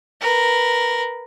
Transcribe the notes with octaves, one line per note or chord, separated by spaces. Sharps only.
A#4 B4